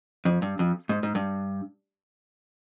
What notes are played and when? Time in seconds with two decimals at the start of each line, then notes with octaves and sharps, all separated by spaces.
0.25 F2
0.42 G2
0.59 F2
0.89 G#2
1.03 G#2
1.15 G2